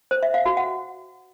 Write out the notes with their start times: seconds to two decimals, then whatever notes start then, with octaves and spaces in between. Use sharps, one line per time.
0.11 C5
0.23 E5
0.34 F5
0.46 F#4
0.57 F#5